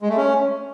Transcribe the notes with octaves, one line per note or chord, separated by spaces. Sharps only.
G#3
A3
C#4